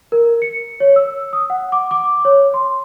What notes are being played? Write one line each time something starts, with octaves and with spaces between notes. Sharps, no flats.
A#4
C#7
C#5
E6
D#6
F#5
D6
D6
C#5
C6